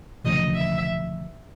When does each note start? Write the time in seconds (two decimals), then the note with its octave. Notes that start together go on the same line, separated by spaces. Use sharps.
0.25 E1 D2 C#3 F3 D#5
0.55 E5